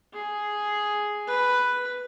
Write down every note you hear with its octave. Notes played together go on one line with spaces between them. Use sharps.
G#4
B4